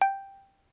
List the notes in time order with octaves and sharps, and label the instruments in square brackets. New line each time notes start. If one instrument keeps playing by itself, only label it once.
[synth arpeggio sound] G5